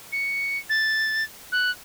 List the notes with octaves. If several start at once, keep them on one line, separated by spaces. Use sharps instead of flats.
C#7
A6
F#6